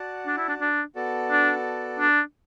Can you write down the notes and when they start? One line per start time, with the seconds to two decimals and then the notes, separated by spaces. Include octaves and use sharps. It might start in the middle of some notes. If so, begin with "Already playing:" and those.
Already playing: F#4 D5 F#5 A5
0.26 D4
0.37 E4
0.48 D4
0.61 D4
0.95 B3 F#4 A4 D5 A5
1.31 D4
2.00 D4